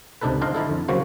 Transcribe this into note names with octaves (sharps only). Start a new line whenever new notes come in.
C#2 C3 D4 D#4 A4 B4
D4 D#4 F4 C5 D#5 F5
D3 D#4 E4 A4
F2
C#3 F3 F#3 A#3 F#4 C5